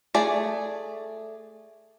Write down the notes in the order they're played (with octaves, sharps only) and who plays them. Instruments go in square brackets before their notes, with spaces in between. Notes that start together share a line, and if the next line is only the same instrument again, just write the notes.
[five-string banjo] A3 G#4 D5